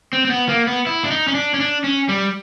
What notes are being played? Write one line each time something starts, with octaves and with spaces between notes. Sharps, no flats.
C4
C4
B3
A#3
B3
E4
D4
D#4
C#4
D4
C#4
D4
C#4
G3